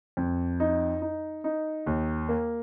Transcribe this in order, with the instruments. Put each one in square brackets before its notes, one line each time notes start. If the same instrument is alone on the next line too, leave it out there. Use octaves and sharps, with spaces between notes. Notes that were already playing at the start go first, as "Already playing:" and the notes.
[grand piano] F2
D#4
D#4
D#4
D#2
A#3